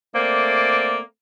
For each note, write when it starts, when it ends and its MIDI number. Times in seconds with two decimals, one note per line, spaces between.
0.14 0.99 57
0.14 0.99 58
0.14 0.99 60
0.14 0.99 74